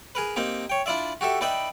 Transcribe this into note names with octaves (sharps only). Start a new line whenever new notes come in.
G#4 A#4 B4
A#3 C4 D#4 G4
C#5 G5
D4 E4 F4 D5 E5
F#4 G4 A4 E5
D#4 B4 D5 E5 G5 B5